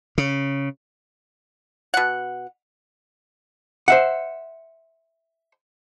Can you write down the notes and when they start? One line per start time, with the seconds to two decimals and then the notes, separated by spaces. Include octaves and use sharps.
0.18 C#3
1.94 B2 F#5
3.88 C5 E5 F#5